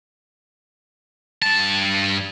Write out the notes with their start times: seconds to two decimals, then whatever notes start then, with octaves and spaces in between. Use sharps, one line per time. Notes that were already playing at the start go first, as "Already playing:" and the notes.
1.42 G2 A5